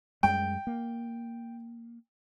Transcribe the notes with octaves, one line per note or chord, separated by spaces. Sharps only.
F#2 G3 G#3 G5
A#3